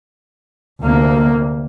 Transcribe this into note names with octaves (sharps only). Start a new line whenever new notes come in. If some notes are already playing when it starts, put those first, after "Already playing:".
D2 C3 A#3